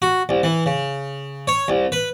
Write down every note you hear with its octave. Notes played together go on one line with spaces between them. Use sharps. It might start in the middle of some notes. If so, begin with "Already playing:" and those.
F#4
C2
E3
C#3
C#5
C2
B4